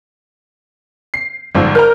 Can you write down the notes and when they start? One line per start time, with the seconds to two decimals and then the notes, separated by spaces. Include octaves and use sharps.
1.14 C7
1.55 G1 G#2 F3 D5 E6
1.75 A#4 A#5 F6 G6